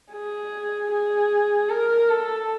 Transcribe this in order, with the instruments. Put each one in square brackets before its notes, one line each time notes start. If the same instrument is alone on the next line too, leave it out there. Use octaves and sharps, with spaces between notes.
[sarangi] G#4
G#4
A#4
A4